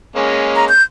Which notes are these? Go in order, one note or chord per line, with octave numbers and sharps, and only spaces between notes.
G#3 A#3 C#4
A#5
G6